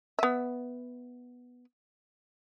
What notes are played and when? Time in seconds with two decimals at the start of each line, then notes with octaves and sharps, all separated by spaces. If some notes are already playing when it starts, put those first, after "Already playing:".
0.19 B3 E5